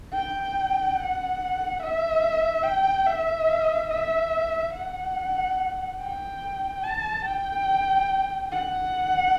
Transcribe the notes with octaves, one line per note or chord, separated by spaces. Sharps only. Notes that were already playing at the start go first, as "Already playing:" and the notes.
G5
F#5
E5
G5
E5
E5
F#5
G5
A5
G5
F#5